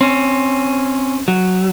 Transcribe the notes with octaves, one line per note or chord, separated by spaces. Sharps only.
C4 C#4
F#3